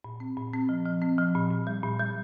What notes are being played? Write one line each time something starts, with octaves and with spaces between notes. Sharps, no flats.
A#2
C4
A#2
C4
F3
F3
C4
F3
A#2
A#2
G3
A#2
G3